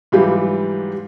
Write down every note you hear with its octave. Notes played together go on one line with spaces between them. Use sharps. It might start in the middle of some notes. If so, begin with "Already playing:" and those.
G#2 E3 F#3 G3 F4 G4